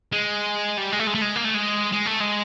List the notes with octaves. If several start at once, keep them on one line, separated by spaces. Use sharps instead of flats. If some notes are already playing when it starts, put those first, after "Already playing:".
G#3
G3
G#3
A3
G#3
A3
G#3
A#3
A3
G#3
G#3
A3
G#3